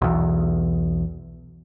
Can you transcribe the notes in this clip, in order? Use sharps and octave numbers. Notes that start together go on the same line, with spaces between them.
B1 E2